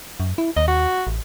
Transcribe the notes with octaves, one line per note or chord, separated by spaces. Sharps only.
F#2
E4
D#2 D#5
F#4
A1